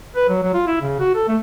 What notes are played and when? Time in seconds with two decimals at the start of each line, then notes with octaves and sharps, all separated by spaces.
0.16 B4
0.29 F#3
0.43 F#3
0.54 F4
0.67 E4
0.81 C#3
1.00 F#4
1.15 A4
1.28 A3